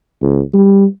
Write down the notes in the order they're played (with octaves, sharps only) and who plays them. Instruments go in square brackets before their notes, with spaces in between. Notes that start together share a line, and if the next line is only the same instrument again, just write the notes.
[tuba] C#2
G3